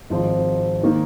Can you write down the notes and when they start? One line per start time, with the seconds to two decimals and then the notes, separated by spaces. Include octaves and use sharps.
0.10 G#1 G#2 F3 C4 F4
0.83 D#3 A#3 D#4